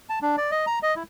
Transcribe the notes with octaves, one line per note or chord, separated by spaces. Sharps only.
A5
D4
D5
D#5
A#5
D#5
E4